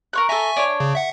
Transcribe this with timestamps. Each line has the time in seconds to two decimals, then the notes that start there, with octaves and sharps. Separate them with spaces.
0.13 A#4 C#6 F#6
0.29 A4 E5 G#5 A#5 C#6
0.57 D4 C#5
0.80 C#3
0.95 E5 F#5